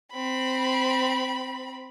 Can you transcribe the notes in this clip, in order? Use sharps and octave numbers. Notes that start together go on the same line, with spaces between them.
C4 B5